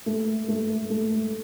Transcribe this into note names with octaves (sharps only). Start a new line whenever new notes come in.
A3
A3
A3